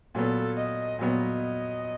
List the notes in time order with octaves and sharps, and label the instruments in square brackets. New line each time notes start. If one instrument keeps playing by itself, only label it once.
[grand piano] A#2 F#3 B3 [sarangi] A4
[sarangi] D#5
[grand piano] A#2 F#3 B3 [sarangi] D#5